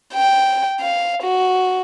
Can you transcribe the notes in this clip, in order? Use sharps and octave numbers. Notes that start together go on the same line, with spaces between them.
G5
F5
F#4